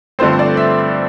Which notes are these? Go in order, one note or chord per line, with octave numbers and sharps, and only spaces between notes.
G2 D3 F3 A3 C4 C5
D5
E5